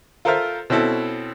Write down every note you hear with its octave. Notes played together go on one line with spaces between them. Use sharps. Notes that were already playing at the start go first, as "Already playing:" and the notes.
F4 A4 A#4 C5 E5 F6
B2 C4 C#4 E4 A4